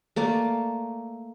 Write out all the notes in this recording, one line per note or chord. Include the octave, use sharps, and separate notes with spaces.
A3 A#3 D5